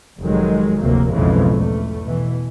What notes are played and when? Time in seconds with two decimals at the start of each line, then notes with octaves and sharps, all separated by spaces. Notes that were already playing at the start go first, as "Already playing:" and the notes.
0.20 F1 D#3 F#3 G#3
0.82 F1 D2 C3 F#3 A#3
1.13 B1 F2 G#2 C#3 E3 G#3
1.52 E2 A3
2.03 B2 E3